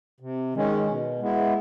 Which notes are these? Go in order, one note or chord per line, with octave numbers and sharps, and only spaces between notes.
C3
D#3 G#3 C#4
B2
G#3 B3 E4